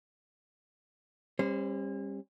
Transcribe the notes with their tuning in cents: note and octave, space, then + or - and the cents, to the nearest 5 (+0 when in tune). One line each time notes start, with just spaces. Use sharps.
G3 +25 C#4 -40 C5 -20